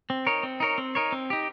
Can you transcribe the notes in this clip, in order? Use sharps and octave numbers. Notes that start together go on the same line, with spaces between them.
C4
D#4 A#4 C#5
C4
D#4 A#4 C#5
C4
D#4 A#4 C#5
C4
D#4 G4